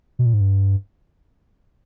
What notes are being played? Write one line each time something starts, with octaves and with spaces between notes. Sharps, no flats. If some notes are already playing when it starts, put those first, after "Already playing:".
B2
A#2
G#2
G2